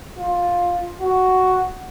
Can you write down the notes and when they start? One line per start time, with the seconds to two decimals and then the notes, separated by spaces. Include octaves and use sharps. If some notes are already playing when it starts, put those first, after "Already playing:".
0.18 F4
1.00 F#4